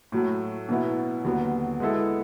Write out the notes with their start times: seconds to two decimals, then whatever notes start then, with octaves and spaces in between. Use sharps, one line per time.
0.12 A2 F#3 A3
0.69 B2 F#3 B3 E4
1.24 D#2 D3 F#3 B3
1.80 G#3 B3 E4 A4